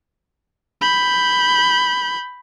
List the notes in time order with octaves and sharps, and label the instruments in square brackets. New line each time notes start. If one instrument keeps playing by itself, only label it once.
[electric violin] B5 G6